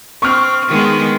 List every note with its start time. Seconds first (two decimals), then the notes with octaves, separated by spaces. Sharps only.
0.22 C4 C#6 F6
0.68 D#3 G#3 B3